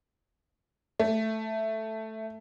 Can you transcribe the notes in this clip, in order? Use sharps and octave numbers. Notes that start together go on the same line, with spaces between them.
A3